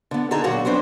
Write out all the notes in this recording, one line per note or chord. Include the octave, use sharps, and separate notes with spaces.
D3 B3
D3 D#4 G#4 A4 A#5
A#2 D3 F#3 A#3 F#4
F2 F#3 B3 C4 D4 C5